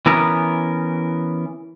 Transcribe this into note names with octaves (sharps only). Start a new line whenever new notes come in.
E3 B3 C#4 A#4